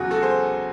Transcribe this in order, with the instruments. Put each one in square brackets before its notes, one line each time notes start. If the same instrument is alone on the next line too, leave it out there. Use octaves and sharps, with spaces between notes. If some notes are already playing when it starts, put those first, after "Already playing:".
Already playing: [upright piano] E2 C#3 F#3 F#4
F#4 A4
G#4 C5